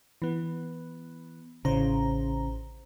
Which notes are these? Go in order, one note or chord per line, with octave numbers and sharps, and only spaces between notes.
E3 B3
A1 C#3 C5 A#5